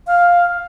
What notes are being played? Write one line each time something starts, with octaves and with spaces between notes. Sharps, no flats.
F5